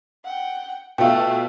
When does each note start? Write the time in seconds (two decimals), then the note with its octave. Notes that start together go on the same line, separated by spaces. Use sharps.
0.25 F#5 G5
0.98 B2 A3 F4 G5